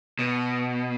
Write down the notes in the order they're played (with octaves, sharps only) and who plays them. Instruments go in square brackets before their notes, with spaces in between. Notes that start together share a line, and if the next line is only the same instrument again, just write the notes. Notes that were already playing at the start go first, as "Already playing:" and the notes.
[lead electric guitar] B2